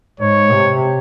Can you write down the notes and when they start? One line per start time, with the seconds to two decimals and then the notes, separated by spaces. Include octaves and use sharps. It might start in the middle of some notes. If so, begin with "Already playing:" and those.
0.20 G#2 C#5
0.51 C3